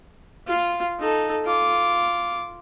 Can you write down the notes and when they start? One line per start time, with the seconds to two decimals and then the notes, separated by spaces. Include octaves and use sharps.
0.47 F4
1.00 D#4 A4
1.45 F4 D6